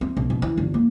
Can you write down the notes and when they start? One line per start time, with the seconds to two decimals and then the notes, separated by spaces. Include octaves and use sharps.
0.01 C4
0.17 B1
0.30 B2
0.42 E3
0.57 G1
0.74 A#3